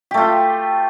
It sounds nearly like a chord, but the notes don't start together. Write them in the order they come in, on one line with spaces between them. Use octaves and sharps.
G4 A3 F4